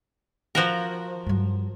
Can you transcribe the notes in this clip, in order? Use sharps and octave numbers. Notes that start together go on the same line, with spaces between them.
F3 F#4 A#4
G2 F#3